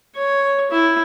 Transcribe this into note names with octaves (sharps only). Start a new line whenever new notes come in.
C#5
E4